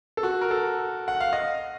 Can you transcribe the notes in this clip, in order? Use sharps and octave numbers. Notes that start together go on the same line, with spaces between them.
A4
F#4
A#4
A4
F#5
F5
D#5